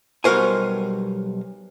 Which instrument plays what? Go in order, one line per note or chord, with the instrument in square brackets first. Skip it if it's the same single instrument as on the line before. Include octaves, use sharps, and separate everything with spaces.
[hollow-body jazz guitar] B1 G3 F#4 A#4 C5 G#5